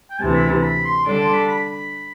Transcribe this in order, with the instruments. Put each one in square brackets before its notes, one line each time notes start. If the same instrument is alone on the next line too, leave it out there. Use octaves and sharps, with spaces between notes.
[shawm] G5
[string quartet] D2 C3 E3 [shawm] A5
[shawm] B5
A5
B5
C6
[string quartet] D3 G3 D4 A4 D5
[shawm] C6
B5
B5